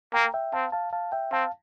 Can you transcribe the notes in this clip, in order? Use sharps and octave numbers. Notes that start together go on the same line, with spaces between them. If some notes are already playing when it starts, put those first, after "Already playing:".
A#3 G5 A#5
E5 G5
C4 F5 A5
F5 A5
F5 A5
E5 G5
C4 F5 A5